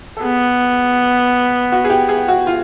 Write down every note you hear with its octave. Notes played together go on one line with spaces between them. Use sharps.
A4
B3 G#4
F#4
G#4
G4
G#4
F#4
F4